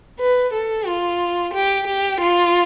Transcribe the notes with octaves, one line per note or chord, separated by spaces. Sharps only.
B4
A4
F4
G4
G4
F4